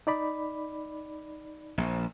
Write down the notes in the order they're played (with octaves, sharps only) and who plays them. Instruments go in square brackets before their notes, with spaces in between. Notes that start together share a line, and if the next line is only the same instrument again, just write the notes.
[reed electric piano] D#4 D5 B5
[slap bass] A#1